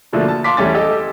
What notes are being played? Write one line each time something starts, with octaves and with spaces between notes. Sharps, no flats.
B2 D3 F3 A3 A#3
A5
F5 A5 C6 D6 B6
E2 E3 G3 A3 C#4 A6
G4 A4 D#5